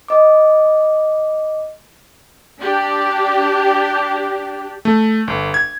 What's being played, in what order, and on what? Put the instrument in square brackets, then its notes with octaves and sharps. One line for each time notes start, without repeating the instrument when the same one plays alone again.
[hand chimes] D#5 D6
[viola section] D4 G4
[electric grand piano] A3
G1
G#6